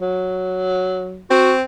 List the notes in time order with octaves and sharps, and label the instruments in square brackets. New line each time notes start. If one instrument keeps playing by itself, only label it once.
[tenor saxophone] F#3
[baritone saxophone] C4 [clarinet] F#4